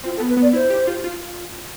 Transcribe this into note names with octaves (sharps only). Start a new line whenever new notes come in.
C4 F4
A4
B3
B4
B3 D5
E4 C5
G4
F4
F4